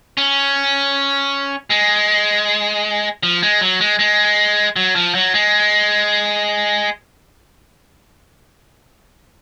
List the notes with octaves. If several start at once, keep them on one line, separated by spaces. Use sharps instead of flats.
C#4
G#3
F3
G#3
F#3
G#3
G#3
F#3
F3
F#3
G#3